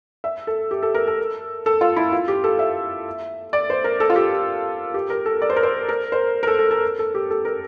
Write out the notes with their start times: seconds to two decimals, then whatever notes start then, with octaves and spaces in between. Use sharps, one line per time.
0.24 E5
0.47 A4
0.71 G4
0.83 A4
0.94 A#4
1.07 A4
1.66 A4
1.81 F4
1.96 E4
2.12 F4
2.28 G4
2.44 A4
2.59 E5
3.53 D5
3.70 C5
3.84 A#4
4.00 A4
4.10 F4
4.16 G4
4.94 G4
5.10 A#4
5.26 A4
5.42 D5
5.50 C5
5.56 A#4
5.63 C5
5.89 A#4
6.12 C5
6.43 A#4
6.47 A4
6.59 A4
6.71 A4
6.99 A4
7.14 G4
7.30 A4
7.45 A#4